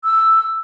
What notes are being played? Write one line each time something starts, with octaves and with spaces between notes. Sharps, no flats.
E6